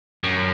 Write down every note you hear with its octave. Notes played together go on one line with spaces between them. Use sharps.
F#2